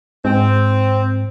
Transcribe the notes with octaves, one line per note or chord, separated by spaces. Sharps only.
G#2 C4